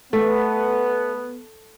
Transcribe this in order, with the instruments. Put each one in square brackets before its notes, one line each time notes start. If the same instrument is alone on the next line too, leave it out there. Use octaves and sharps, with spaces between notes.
[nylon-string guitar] A3 [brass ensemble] B3